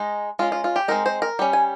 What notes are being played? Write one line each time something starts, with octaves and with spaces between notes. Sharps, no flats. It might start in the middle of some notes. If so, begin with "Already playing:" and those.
Already playing: G#3 D#4
G#3 C#4 F4
F4
F4
G4
G#3 C4 D#4 A#4
C5
A#4
G3 C#4
G#5